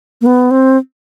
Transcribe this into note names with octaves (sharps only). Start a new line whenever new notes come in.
A#3
B3
C4